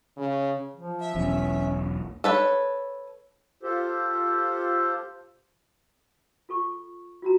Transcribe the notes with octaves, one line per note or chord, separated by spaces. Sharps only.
C#3
F3
E5
E1 B1 E2 C#4
A4 B4 C#5
F4 G4 A4 C5
F4 A4 C#6
F4 F#4 A#5